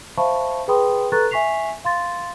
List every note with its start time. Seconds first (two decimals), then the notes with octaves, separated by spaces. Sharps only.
0.17 C5 E5 F5 A5 B5 C#6
0.68 G#4 B4 G5 B5 C6 D#6
1.12 A4 B4 A#5 C#6 F#6 A6
1.31 E5 G#5 C#6 B6 C7 F7
1.84 F5 C6 A6